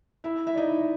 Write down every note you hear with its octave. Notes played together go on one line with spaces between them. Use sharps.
E4 E5
E4 E5
D5
D#4 D#5